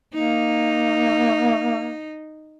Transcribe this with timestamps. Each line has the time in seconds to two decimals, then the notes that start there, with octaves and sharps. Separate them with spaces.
0.14 A#3 D#4